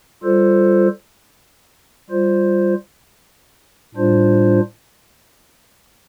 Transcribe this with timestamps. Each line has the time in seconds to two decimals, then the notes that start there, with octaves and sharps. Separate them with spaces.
0.23 G3 F4 A4 C5
2.10 G3 F4 C5
3.95 A2 G3 D4 F4 C5